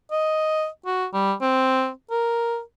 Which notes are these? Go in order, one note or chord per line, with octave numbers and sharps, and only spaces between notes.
D#5
F#4
G3
C4
A#4